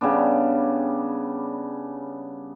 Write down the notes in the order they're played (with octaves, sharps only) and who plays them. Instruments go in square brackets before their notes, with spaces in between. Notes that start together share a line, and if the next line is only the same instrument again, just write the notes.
[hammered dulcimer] C#3 G3 B3 D4